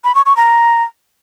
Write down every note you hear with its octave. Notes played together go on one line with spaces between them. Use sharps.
B5
C#6
C#6
A#5